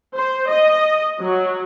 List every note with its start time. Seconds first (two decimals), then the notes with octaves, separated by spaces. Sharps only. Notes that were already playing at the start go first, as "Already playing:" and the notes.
0.15 C5
0.48 D#5
1.22 F#3